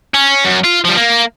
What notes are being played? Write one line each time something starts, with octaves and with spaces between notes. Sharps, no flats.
C#4
F#2
F4
F3 G3
A#3